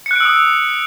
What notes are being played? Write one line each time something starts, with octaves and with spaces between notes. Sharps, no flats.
D#6 E6 F#6 C#7 D7